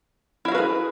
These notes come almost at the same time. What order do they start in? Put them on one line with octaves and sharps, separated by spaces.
E4 F5 F#4 B4 G#4